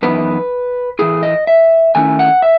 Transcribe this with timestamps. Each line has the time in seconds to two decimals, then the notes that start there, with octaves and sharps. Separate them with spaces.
0.02 F#2 E3 B3 D#4 B4
0.99 A2 E3 A3 E4 G#4
1.23 D#5
1.47 E5
1.95 D#3 A3 C#4 E4 G#5
2.19 F#5
2.42 E5